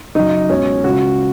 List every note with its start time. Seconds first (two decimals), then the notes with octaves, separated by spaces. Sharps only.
0.15 F#2 C#3 D#4
0.50 C#2 B2 C#4
0.84 C#2 C#3 F#4